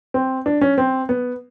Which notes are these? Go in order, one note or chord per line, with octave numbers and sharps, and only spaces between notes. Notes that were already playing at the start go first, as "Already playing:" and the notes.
C4
D4
C#4
C4
B3